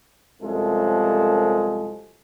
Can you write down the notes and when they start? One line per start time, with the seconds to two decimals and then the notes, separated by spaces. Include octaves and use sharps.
0.42 C2 F#2 F3 G#3 A4